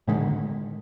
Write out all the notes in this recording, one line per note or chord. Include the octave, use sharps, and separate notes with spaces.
A2 D3 D#3 G#3